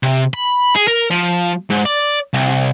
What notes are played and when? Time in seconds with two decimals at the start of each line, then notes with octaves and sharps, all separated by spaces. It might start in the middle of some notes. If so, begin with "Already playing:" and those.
0.03 C3
0.34 B5
0.75 G#4
0.87 A#4
1.10 F3
1.70 G#2
1.85 D5
2.33 C2